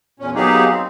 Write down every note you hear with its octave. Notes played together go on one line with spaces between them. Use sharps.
E2 A#2 C#4
F#3 A#3 B3 D#4 G4 G#4
C4